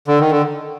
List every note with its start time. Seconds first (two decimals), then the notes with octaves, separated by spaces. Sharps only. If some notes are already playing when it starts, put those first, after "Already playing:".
0.08 D3
0.19 D#3
0.31 D3